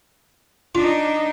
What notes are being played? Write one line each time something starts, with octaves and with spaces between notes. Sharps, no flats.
D4 D#4 F4